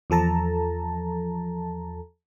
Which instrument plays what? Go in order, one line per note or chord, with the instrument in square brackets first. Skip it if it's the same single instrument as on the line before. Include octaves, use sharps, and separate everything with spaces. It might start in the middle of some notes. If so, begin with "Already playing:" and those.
[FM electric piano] E2 F3 A4 A5 A#5